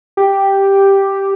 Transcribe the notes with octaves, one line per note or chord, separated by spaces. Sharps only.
G4